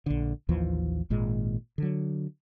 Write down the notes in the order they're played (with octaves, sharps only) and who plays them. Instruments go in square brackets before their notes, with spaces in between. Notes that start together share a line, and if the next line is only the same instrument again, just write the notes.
[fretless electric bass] A#1 D3
A1 D#2 E3 F3
G#1 A#2 G#3
D3 F#3